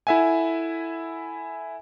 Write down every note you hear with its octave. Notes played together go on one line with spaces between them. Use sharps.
E4 A4 E5 F#5 G#5